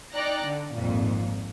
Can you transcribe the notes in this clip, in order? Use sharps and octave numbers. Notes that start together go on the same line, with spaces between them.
D#4 D5 G5 A#5 F#6 A#6
D3
G#1 F2 A#2